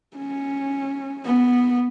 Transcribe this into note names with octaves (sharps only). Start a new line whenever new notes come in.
C#4
B3